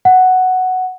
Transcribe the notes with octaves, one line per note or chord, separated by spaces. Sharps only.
F#5